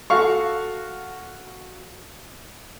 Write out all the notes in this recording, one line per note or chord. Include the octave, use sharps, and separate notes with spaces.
F#4 A4 F5 C#6